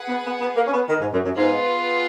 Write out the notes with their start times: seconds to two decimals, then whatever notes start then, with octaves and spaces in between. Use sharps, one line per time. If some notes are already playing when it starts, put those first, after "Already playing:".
Already playing: G#4 B4 F#5
0.09 B3
0.25 B3
0.41 B3
0.56 A#3
0.67 C#4
0.73 B3
0.89 D#3
1.01 G#2
1.13 F#2
1.25 F#2
1.37 G#2 B3 F4 G#4 B4